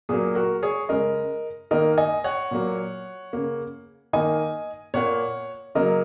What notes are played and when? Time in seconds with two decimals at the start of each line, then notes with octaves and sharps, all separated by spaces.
0.09 A#2 F#3 A#3 G#4
0.35 F#4 A#4
0.63 G#4 C#5
0.89 C#3 G#3 A#4 D#5
1.71 D#3 A#3 A#4 D#5
1.98 D#5 G#5
2.24 C#5 F#5
2.51 A#2 F#3 A#3
3.33 C#3 A#3
4.13 D#3 A#3 D#5 G#5
4.94 A#2 A#3 C#5 F#5
5.75 C#3 F#3 A#3 A#4 D#5